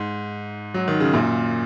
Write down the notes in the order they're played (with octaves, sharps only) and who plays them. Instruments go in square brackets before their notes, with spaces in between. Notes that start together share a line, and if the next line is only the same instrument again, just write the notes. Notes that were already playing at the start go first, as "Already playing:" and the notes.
Already playing: [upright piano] G#2
F#3
D#3
C#3
F#2 A#2